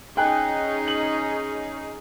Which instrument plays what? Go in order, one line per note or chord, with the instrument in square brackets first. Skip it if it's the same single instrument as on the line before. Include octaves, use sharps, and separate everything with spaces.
[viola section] C#4 D#4 G#4 [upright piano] G5 G#5 F#6
[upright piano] F#7